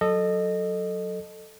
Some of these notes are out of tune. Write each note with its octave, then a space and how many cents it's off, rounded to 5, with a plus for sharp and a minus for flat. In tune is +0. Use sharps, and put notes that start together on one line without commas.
F#3 -5 A4 +0 D#5 -20